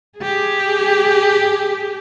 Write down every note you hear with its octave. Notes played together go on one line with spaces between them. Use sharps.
G4 G#4